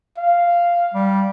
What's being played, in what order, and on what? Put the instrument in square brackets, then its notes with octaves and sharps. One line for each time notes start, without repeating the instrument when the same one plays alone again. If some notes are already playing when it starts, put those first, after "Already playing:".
[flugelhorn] F5
[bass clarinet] G3